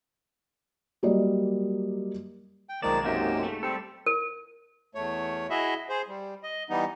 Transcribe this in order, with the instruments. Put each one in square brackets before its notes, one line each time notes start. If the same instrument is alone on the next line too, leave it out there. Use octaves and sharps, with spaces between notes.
[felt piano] F#3 G3 A#3 A#4 D5 D#5
[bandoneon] G5
[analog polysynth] B1 G#3 E7 [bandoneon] D#3 F3 A#3 [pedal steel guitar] D5
[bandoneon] F#2 C3 [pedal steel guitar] A#3 D#4 G4
[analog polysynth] A3
[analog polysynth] G3 [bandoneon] C4 [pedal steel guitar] A4
[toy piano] A#4
[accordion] E2 A3 C#5
E4 F#4 G#4 D#5 E5
G#4 C5
G3
D#5
E3 G3 B3 D#4